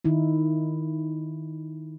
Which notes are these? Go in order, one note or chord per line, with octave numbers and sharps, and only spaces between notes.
D#3 D#4 E4